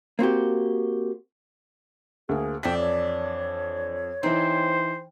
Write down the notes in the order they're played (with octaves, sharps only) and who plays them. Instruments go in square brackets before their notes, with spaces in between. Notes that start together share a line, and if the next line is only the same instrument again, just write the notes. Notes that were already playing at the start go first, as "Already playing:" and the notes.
[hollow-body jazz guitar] A#3 C4 F#4 G4
[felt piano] D2 A#3 [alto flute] G#4
[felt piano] F2 B6 [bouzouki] E3 D4 [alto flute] G5
[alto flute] C#5
[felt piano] E3 D#4 [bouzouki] C4 [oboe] C5